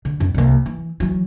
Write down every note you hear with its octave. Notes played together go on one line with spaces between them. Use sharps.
D3
F#2 B3
C2 A#3
E3
E3 F#3